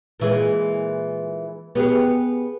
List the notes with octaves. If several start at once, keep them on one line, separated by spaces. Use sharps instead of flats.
A#2 E3 G#3
B3 G4 G#4